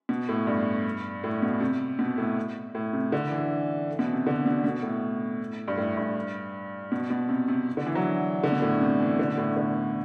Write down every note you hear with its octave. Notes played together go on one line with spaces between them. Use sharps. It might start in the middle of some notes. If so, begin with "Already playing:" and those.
B2
A2
G2
A2
B2
C3
B2
A2
A2
C3
D3
E3
B2
C3
D3
B2
B2
A2
G2
A2
G2
B2
B2
C3
C3
D3
E3
F#3
D3
B2
A2
C3
E3
D3
B2
A2
D3